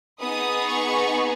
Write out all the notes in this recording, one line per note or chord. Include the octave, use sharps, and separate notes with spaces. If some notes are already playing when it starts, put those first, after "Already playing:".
B3 D#4 G#4 D#6
C#6